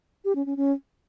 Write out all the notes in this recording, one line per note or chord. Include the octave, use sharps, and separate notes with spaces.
G4
C#4
C#4
C#4